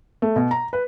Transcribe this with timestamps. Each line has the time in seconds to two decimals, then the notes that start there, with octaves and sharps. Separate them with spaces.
0.22 A3
0.36 B2
0.51 A#5
0.73 B4